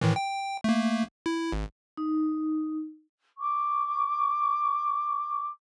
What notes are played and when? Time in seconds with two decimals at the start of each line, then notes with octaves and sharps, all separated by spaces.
0.01 A2 D#3 E3
0.16 G5
0.64 A3 A#3
1.26 E4
1.52 G#1
1.97 D#4
3.38 C#6 D6